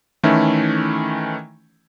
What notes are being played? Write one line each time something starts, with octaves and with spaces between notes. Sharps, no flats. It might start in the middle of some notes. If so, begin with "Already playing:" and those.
D#3 E3 A3 C#4 E4 A4